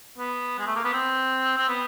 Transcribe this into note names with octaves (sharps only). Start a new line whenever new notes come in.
B3
G#3
A3
A#3
B3
C4
C4
B3